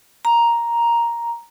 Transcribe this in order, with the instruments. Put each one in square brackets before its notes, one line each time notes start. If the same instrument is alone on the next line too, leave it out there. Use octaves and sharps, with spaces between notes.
[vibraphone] A#5